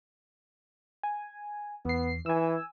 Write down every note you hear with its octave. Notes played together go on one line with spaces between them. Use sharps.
G#5
E2 B3 C7
E3 G#5 E6